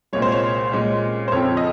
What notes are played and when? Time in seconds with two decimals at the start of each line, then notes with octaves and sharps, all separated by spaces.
0.13 C2 A#2 G#3 C#5
0.22 C5
0.32 C#5
0.72 A#2 G#3 C#4
1.28 C5
1.32 F2 C#3 F3 C4 C#5
1.57 D#5